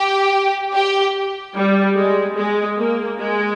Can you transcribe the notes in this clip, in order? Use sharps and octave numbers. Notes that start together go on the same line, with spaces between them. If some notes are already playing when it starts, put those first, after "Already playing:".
Already playing: G4
G4
G3
G#3
G#3
A#3
G#3